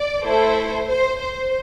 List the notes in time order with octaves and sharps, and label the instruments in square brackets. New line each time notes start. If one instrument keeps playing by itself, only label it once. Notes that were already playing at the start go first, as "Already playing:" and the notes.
Already playing: [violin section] D5
A3 E4 A4 C5
C5
C5